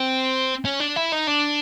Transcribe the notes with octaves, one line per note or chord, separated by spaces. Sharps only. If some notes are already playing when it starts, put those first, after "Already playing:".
Already playing: C4
C#4
D4
E4
D#4
D4